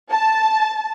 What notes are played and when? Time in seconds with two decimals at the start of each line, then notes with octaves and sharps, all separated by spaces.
0.11 A5